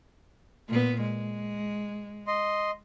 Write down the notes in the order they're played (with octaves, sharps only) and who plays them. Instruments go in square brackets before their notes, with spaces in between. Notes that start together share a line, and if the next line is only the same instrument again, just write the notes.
[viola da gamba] A#2 B3
G#3
[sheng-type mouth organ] D#5 C6